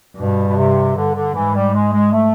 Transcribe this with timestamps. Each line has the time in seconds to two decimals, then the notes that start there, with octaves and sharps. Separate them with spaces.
0.17 G2 B2
0.47 B2
0.56 C3
0.95 D3
1.14 D3
1.33 G#2 E3
1.54 G3
1.73 G#3
1.93 G#3
2.12 A3